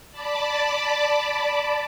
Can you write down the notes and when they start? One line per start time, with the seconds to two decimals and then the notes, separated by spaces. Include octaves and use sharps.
0.11 D5 A5 B5 D6